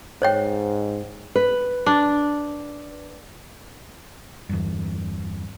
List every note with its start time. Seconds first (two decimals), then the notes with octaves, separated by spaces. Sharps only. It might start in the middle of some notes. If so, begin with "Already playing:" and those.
0.22 G#2 C5 C#5 G5
1.35 B4
1.86 D4
4.49 E2 G2